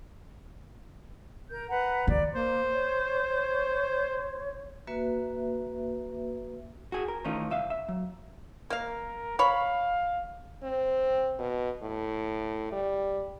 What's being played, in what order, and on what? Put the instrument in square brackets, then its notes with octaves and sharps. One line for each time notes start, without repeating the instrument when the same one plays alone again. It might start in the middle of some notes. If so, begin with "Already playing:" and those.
[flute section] A#4 G6
B4 F#5 A#5
[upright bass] D#3 [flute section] D5
[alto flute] A#3 [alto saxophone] C5
[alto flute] C#5
[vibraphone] A#3 F#4 B4 E5
[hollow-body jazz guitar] F#4 G#4
A#4
D#3 E3 A3 C#4 D#4 F4
C2 E5 F5
E5
F#3
[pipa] A#3 F5 [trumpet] A#4
[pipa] C#5 B5 [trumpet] F5
[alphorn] C4
B2
A2
G3